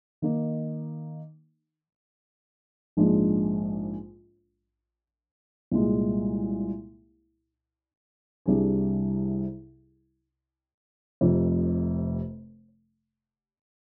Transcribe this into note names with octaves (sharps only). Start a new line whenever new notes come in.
D#3 A#3 D#4
A#1 G#2 F3 G#3 D4
C2 A#2 G#3
C2 C3 G3 D4 G#4
F1 F2 C3